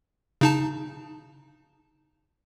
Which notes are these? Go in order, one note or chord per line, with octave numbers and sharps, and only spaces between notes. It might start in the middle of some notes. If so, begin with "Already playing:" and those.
C#3 D#4 A5